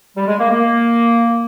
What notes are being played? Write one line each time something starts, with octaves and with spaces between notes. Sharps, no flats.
G3
G#3
A#3
A#3